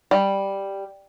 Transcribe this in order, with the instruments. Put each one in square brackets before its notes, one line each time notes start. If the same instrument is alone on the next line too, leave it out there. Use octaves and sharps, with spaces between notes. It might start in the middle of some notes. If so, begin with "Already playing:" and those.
[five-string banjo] G3